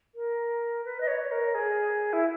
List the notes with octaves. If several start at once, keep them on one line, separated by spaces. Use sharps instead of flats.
A#4
B4
D#5
C#5
A#4
G#4
E4